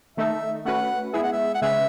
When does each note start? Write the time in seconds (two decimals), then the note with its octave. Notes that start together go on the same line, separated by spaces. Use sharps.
0.17 D#3 A3 D#4 A4 E5
0.65 A3 C#4 F#4 B4 F#5
1.13 G#3 B3 E4 G#4 E5
1.23 F#5
1.33 E5
1.55 F#5
1.62 C#3 G#3 C#4 G#4 B4 E5